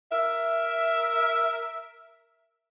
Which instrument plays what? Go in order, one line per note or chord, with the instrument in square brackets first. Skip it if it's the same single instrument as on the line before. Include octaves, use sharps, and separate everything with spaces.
[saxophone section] A#4 E5